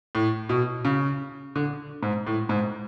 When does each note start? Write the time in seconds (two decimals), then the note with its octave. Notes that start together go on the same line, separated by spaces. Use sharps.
0.15 A2
0.49 B2
0.85 C#3
1.56 D3
2.03 G#2
2.27 A2
2.49 G#2